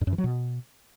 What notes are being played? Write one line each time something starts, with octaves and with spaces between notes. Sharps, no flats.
G2
F#2
E3
F#3
B2